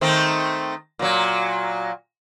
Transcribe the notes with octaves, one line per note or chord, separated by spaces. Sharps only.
D#3 A3 C4
A#2 F#3